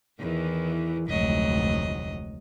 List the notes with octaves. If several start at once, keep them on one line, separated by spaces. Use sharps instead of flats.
E2 D#3 E3
F1 D2 G#2 F#3 D#5